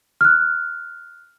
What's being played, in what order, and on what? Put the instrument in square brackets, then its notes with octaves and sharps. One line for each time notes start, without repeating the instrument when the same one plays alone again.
[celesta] F6 F#6